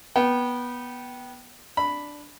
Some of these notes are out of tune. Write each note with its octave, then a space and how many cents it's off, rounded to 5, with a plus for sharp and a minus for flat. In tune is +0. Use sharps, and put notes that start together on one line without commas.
B3 -15 G5 -25
D4 +0 B5 +0